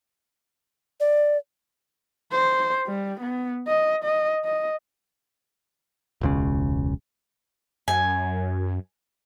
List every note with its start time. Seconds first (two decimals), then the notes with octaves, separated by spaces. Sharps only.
1.00 D5
2.32 C5
2.87 G3
3.21 B3
3.68 D#5
4.04 D#5
4.45 D#5
6.21 E1 C#2 C#3
7.88 F#2 G#5